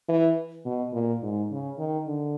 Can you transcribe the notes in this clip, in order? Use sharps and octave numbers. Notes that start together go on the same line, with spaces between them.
E3
B2
A#2
G#2
C#3
D#3
D3